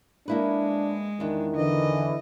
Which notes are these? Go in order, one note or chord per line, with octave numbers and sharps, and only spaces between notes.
G#3 A#3 D4 E4 B4
E2 D#3 D4
D3 E3 D#5